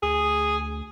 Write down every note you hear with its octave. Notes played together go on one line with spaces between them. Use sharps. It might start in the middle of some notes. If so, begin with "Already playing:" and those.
D2 G#4